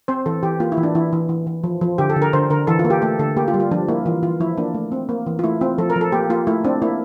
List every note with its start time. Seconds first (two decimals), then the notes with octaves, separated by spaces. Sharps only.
0.08 C4 C5
0.26 E3 A4
0.43 E3 G4
0.60 A#3 F4
0.72 E4
0.77 E3
0.83 D4
0.95 E3 E4
1.13 E3
1.29 E3
1.47 E3
1.64 F3
1.81 F3
1.98 D3 G4
2.10 A4
2.16 D3
2.22 A#4
2.33 D3 C5
2.50 D3 A#4
2.67 E3 A4
2.79 F4
2.85 A#3
2.90 G4
3.02 A3 A4
3.19 D3 A4
3.37 A#3 G4
3.48 F4
3.54 G3
3.60 F4
3.71 F3 D4
3.88 A#3 E4
4.06 E3 F4
4.23 E3 F4
4.40 F3 E4
4.58 A#3 D4
4.74 A3
4.92 C4
5.09 A#3
5.26 E3
5.39 F4
5.44 A3 E4
5.61 C4 F4
5.78 F3 A4
5.90 A#4
5.96 F3
6.01 A4
6.12 A#3 G4
6.30 A#3 F4
6.47 A3 E4
6.64 C4 D4
6.82 A#3 E4